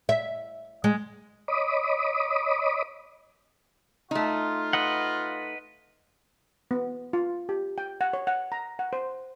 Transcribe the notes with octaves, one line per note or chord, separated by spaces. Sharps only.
E5
G#3
C#5 D#5 B5 D6 D#6
A3 D#4 F4
B4 D#5 F#5
B3
F4
G4
G5
F#5
C#5
F#5
A#5
F#5
C5